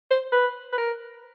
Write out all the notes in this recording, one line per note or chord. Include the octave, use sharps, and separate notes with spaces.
C5
B4
B4
A#4